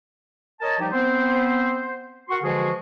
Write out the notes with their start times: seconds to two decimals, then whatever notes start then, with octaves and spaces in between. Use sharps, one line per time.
0.61 A#4 C#5 D#5 A5
0.79 F3 G3 D#4 G4
0.92 B3 C4 C5
2.29 F#4 A#4 F#5 C6 C#6
2.43 D3 E3 F3 G#3 F#4 G#4